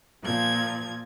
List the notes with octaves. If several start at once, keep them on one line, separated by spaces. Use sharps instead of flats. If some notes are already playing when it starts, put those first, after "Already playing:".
A#2 F3 G#6